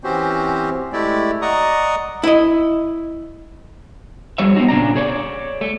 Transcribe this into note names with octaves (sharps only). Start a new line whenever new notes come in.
E3 C4 C#4 F#4 G4 C5
G#3 A3 E4 G4 D5
D5 D#5 F#5 A#5 C#6 D#6
E4 D#5
F2 G3 C#5 E5
B3 C4 D#4 F#4
A#2 C#3 D4 A#5
G#4 C#5 D5
A3